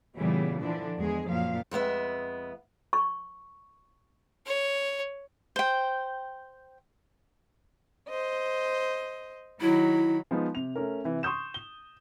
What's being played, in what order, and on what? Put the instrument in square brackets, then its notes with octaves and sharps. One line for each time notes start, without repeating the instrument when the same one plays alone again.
[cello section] A#2 C#3 E3 G3 B3
D3 E3 F3 D4
E2 G#3 G#4
F#2 A#2 F3 F5
[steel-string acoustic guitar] F2 G#3 B3 E5
[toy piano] C#6
[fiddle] C#5
[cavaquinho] C5 G5
[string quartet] C5 D#5
[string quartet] D#3 F#3 B5 [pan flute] E4
[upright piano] F3 G#3 B3 D#4
C3 F7
A3 C#4 A#4
C3 E3
C6 C#6 D#6 G6 E7
G7